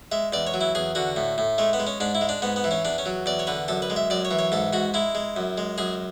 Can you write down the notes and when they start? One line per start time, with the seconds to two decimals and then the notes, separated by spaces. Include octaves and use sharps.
0.12 G#3 E5
0.33 E2 D5
0.47 C#5
0.54 F#3
0.61 E4
0.75 E2 G#4
0.95 D3 F#4
1.16 A2
1.38 A2
1.58 G#3 A3
1.73 B3
1.80 G#3
1.87 C#4
2.00 G#2 D4
2.15 E4
2.21 G#3
2.29 D4
2.42 G#2 B3
2.56 B3
2.64 E3
2.71 C#4
2.85 E2 D4
2.98 C#4
3.06 F#3
3.26 E2 D5
3.39 C#5
3.47 D3 B4
3.68 F#2 A4
3.82 B4
3.90 G#3
3.96 E5
4.10 F#2 D5
4.25 C#5
4.31 E3
4.39 C#5
4.52 G#2 A4
4.73 G#2 F#4
4.94 G#3 E4
5.15 G#3
5.36 F#2
5.58 G#3
5.78 F#2 G#4